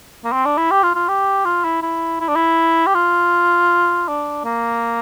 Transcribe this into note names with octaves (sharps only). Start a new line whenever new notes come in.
A#3
C4
D4
E4
G4
F4
F4
G4
F4
E4
E4
E4
D4
E4
G4
F4
D4
A#3